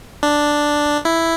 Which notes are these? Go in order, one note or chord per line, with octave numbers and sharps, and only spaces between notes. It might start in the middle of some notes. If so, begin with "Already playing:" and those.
D4
E4